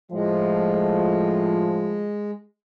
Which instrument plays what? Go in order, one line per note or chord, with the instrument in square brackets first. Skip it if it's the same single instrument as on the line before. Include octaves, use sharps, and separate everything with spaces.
[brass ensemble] A2 F3 [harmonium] G#3